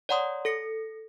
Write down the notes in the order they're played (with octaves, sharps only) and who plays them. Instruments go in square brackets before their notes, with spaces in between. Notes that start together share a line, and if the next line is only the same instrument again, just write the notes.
[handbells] C#5 D5 F#5 A#5 C6 D#6
A4 A#6 C#7